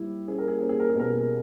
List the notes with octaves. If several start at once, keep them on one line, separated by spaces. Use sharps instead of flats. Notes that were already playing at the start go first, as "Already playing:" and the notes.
Already playing: G3 E4 G4
C#4 G#4
A#4
G#4
C#4 A#4
G#4
A#4
G#4
B2 A#4
G#4
A#4